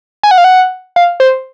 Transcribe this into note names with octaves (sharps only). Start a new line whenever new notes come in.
G#5
F#5
F5
F#5
F5
C5